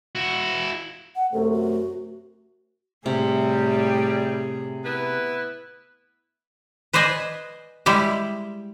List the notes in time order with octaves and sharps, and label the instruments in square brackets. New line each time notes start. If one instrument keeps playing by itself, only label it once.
[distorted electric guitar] E4 F#4
[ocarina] F#5
[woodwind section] F#2 C3 A3 [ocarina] A4
[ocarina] F#4
[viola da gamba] A2 [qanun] C3 [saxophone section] G3 [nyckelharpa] G#4
[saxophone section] B3 E4 B4
[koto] B4 C5 D5 D#5 G#5
G3 G#3 E4 G4